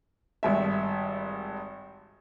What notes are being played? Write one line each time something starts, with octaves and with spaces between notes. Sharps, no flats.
G#1 G2 E5